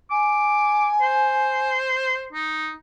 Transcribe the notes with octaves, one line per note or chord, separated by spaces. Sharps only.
G#5 D6
C5
D#4